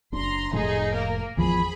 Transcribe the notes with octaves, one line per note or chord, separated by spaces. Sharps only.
F#1 D4 A#5 C6
F1 A2 A3 D#4 G#4
A#3 A#4
G#1 E2 F3 G#4 B5